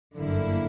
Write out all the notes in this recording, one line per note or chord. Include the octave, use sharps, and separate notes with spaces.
G1 F#2 D3 A#3 E4